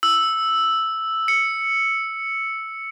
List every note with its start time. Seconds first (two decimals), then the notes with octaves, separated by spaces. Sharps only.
0.03 E6
1.28 C#7